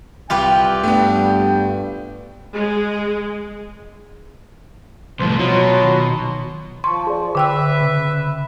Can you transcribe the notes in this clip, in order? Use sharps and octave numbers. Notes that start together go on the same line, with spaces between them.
C2 F4 G4 B4 G5
G2 A3 B3
G#3
C2 A2 F3 B4 C6
B2 F#3 F4 F#4
D#3
F3 A5 C6 C#6
G#4 D5
D3 B4 E5 G5 E6
C#3